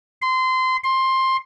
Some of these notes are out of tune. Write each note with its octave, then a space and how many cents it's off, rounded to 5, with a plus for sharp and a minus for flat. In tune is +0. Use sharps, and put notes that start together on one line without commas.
C6 -20
C6 +15